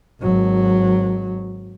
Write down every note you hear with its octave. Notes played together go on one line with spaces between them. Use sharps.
G#1 F#3